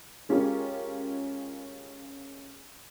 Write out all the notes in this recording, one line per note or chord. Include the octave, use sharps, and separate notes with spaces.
G#3 C#4 F4 G4 A#4